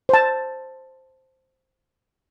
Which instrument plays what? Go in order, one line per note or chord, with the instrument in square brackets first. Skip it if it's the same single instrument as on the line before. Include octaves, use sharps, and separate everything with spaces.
[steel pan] C5 A5